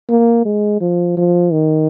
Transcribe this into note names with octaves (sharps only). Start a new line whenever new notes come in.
A#3
G#3
F3
F3
D#3